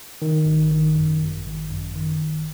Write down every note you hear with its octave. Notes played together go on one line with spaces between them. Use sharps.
D#3
G#1
D#3
F#2
G#1
G#1
F#2
D#3
G#1